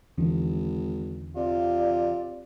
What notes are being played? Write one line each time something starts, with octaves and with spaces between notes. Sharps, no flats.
G#1 E2 D3 E3
C3 F4 D5